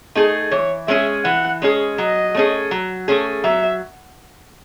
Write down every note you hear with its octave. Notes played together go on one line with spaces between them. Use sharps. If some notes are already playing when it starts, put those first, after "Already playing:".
A3 D#4 G#4
E3 C#5
G#3 C#4 G#4 E5
E3 F#5
G#3 C#4 G#4
F#3 D#5
A3 C#4 G#4
F#3
A3 C#4 G#4
F#3 E5